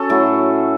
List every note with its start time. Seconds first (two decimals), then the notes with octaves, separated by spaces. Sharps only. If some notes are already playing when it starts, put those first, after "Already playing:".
Already playing: C#4 F#4 A4
0.09 A2 F#3 A3 E4